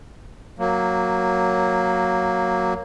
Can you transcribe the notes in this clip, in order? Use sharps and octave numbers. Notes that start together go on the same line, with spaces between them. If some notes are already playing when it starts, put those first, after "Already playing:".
F#3 A#3